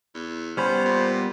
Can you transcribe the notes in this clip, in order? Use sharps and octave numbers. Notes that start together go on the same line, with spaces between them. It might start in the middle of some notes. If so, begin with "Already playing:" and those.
E2
G3 B3 C#4 C5 B5
A#2